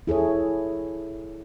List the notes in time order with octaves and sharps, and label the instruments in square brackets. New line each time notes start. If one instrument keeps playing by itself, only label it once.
[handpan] E4 G#4 A4 C#5